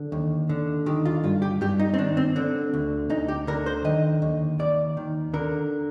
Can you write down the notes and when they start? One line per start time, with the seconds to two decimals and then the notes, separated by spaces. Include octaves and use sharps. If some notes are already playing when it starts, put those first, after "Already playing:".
Already playing: D3
0.12 D#2
0.49 D3
0.86 D#3 G4
1.05 F4
1.24 G2 F4
1.42 G4
1.61 G2 G4
1.79 D#4
1.94 C4
1.98 D#3 D4
2.17 C4
2.36 D3 C4
2.74 D2
3.10 D2 D#4
3.28 G4
3.47 D3 A#4
3.66 C5
3.85 D#3 D#5
4.22 D#2
4.59 D#2 D5
4.97 D#3
5.34 D3 A#4